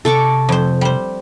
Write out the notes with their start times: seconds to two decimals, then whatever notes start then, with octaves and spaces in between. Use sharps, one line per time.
0.05 C3 A4 C#6 D6
0.49 F2 C5
0.81 G3 C5